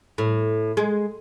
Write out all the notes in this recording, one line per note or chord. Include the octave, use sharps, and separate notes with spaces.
A2
G#3